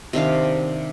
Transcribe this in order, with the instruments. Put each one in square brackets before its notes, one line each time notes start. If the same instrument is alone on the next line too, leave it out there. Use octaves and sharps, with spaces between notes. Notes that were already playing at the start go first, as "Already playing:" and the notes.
[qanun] C3 D#3 D4 F5